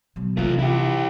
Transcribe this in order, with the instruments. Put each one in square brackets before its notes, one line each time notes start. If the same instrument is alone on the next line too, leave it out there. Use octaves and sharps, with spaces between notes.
[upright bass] B2 F#3
[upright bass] C3 E3 [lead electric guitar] A3 F4
[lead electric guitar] E4 G4